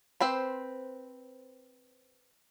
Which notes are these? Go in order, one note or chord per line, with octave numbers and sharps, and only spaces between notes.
C4 B4 C5